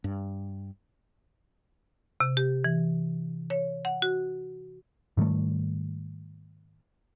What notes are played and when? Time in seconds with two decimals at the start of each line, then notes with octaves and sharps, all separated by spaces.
0.04 G2
2.20 C3
2.37 G4
2.64 E3
3.50 C#5
3.85 F#5
4.02 F#4
5.17 G#2 D#3 G3 A3